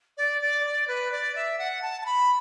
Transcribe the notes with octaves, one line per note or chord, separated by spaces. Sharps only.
D5
D5
D5
B4
D5
E5
F#5
A5
A5
B5